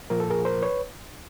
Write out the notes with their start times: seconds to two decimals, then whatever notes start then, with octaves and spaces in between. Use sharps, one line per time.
0.10 A#2 F3 A#3 A#4
0.20 A4
0.30 G#4 A#4
0.45 A#4 C5
0.62 B4 C#5